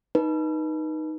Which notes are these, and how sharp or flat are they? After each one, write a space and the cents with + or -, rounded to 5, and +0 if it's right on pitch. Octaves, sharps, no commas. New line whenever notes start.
D#4 +0 B4 -25